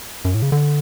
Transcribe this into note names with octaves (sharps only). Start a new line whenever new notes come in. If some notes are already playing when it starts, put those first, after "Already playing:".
F#2
A2
C#3
D3